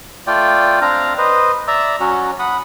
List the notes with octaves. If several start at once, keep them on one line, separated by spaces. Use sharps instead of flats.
A3 F4 D5 G5
C4 D4 F5 A#5
B4 C5 D#5
D5 E5 A#5 E6
F#3 C#4 F#4
F#5 B5 D#6